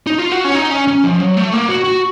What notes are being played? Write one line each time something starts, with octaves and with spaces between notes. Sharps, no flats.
D#4
F4
F#4
C#4
D#4
C#4
C#4
F3
F#3
A3
A#3
F#4
F#4